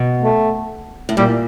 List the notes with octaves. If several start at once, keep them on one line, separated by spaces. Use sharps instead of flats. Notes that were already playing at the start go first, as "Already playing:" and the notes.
Already playing: B2
A3
A2
A#2 G3